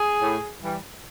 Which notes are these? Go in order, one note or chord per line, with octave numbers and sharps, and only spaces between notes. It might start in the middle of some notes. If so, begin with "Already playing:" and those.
Already playing: G#4
A2
E3 G3